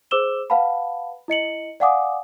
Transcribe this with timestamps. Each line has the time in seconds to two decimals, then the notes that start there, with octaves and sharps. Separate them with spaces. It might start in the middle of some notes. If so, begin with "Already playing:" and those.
0.11 G#4 C5 D6 E6 E7 G7
0.50 B4 F5 F#5 A5 B5
1.28 E4 D#5 C#7 F#7
1.80 D5 F5 F#5 G#5 D6 D#6